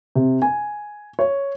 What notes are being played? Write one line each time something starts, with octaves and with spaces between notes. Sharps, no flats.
C3
G#5
C#5